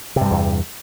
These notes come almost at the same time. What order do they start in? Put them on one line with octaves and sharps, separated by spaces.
C3 G2 G3 E2